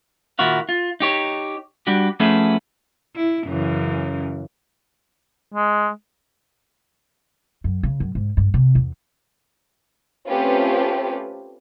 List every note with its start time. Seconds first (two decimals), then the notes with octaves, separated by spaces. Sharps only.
0.39 D#2 A#2 E4 F#4 F5
0.69 F4
1.00 D#4 G4 C#5
1.87 G3 D4 F#4 G4
2.20 F3 A3 B3 C#4 E4 G#4
3.16 E4
3.47 F#2 C#3 E3
5.54 G#3
7.64 F#2
7.83 C#3
8.00 F#2
8.15 G#2
8.37 G2
8.54 C3
8.75 E2
10.27 A3 C4 C#4 F4 G4 B4